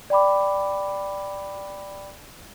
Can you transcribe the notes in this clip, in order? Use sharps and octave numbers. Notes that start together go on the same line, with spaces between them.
D5 G5 B5 D6